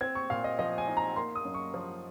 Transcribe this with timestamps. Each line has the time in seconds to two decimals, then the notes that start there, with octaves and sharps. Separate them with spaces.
0.01 C4 G#6
0.15 C#6
0.30 A#2 F5
0.44 D#5
0.59 F3 D#5
0.78 G#5
0.88 D#4
0.97 A#5
1.16 A#3 C6
1.35 D#6
1.45 F#2
1.54 C#6
1.74 F3